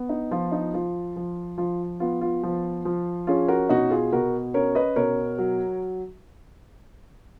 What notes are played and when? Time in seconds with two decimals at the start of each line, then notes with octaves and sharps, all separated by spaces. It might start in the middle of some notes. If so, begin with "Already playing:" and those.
Already playing: B3
0.09 D#4
0.31 F3 F4
0.52 D#4
0.74 F3 F4
1.16 F3
1.58 F3 F4
2.00 B3 F4
2.21 F4
2.43 F3
2.85 F3
3.27 C#4 F4 G#4
3.48 F#4 A#4
3.69 B2 D#4 F#4
3.90 F4 G#4
4.13 B2 F#4 A#4
4.54 C#4 A#4 C#5
4.75 B4 D#5
4.96 B2 A#4 C#5
5.38 F#3